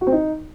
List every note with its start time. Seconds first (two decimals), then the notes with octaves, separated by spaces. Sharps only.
0.01 F#4
0.07 C4
0.12 D#4